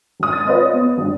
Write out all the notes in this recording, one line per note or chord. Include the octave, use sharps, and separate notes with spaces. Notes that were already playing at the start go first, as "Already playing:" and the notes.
G#1 D#6
A6
F4 B4 C5 D5 D#5
C#5
B3
G#1 G2